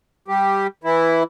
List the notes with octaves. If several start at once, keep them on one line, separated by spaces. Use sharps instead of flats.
G3 G4
E3 E4